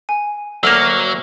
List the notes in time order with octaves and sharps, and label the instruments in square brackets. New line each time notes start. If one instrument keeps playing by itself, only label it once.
[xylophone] G#5
[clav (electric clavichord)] D2 A#3 [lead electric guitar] F#3 [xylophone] E6 F6 F7